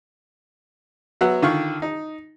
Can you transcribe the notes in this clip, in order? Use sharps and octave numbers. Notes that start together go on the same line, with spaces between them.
F#3 B3 E5 F#5
D3 D#3 F4 C#6 F6
D#4